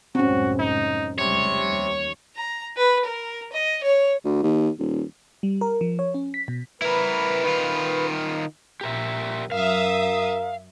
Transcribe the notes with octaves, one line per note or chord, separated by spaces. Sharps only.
C#2 F#2 A2 C4 C#4 F#4
D#4
F1 C#2 C3 G3 C#5
D#2
A#5
B4
A#4
D#5
C#5
D2
D#2
D#1
G3
A#4
F3
C#5
C#4
B6
B2
E4 A#4 B4
D#3 F4
A#1 G4 A#4 E5
F#2 A#4 E5 F5 D#6